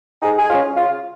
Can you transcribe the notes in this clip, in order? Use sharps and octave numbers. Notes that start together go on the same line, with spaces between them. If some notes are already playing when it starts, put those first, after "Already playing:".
G#2 D#4 G#4
G#4
G#3 C#4 F4
C#3 F4